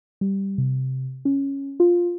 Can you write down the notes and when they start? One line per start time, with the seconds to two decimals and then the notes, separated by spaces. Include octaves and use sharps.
0.21 G3
0.58 C3
1.25 C#4
1.80 F4